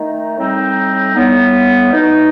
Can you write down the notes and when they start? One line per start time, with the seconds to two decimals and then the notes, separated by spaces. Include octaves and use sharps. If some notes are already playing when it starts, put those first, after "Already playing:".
Already playing: D#3 A3 D#4
0.37 A2 G3 C4 D#4
1.15 A2 G3 B3
1.91 B2 A3 D#4